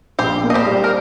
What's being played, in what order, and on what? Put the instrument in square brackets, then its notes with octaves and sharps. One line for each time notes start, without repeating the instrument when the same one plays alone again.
[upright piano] A#1 [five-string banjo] G4 C5
[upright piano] A#3
[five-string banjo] D#5
G4 C5
[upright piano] G3
[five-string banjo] A#4